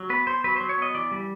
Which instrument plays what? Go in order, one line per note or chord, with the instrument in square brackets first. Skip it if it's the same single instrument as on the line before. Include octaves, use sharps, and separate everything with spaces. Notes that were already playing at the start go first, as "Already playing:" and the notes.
Already playing: [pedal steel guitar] F#3
B3 B4
B3 C5
F#3 B4
F#3 C5
C#5
B3 D#5
E3 D5
G3